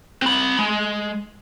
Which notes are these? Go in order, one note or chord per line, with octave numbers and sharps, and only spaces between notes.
C4 B5
G#3